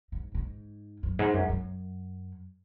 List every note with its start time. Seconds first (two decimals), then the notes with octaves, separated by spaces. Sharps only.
0.12 G#2
0.34 G#2
1.03 F#2
1.19 G#2
1.34 F#2
1.49 F#2